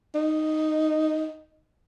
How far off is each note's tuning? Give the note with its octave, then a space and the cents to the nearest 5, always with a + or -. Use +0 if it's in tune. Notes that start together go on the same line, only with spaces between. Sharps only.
D#4 -5